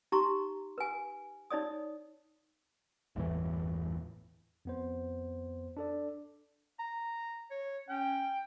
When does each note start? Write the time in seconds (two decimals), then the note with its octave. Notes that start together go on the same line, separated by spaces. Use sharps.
0.12 D#4 G4 A#5 C6 C#6
0.78 B4 G#5
1.50 D#4 C#5 D5 D#6
3.16 G1 E2 A2 E3
4.65 F2 B3 C5
5.77 D4 A4 D5
6.80 A#5
7.51 C#5
7.89 C#4 G5